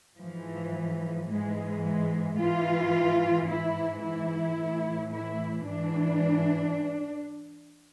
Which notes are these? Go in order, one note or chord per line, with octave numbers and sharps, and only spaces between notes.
G#2 E3 F3
G#2 E3 G#3
G#3
G#2 E3 F4
G#2 E3 E4
E4
A2 E3
E4
G#2 E3 D4